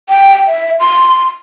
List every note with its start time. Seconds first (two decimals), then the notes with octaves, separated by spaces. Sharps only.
0.09 G5
0.47 E5
0.80 C6